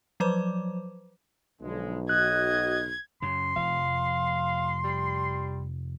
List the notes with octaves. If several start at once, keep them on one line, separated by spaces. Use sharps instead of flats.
F3 F#3 B4 C5 D6
B1 D3 F3 G#3
F#4 D#5 F#6 G#6
F#2 C#3 C6
F1 F3 F5
G3